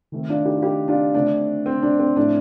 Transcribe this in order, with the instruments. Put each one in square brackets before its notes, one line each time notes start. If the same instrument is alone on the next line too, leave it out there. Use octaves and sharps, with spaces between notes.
[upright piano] D#3 A3 C4
D4 F4
D#4 G4
F4
D#4 G4
D4 F4
D3 A3 C4 D4
C4
D4
C4
A2 F3 A3 C4 D4